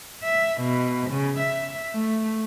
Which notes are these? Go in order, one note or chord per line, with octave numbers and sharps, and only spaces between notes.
E5
B2
C#3
E5
A3